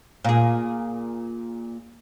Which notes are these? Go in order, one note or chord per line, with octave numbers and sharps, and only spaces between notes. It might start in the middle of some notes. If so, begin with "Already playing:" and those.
A#2 G#4